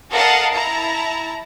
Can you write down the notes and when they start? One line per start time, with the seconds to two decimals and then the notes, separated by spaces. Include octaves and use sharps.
0.11 A4 A#4 D#5 F5 F#5 A5
0.53 E4 A5 A#5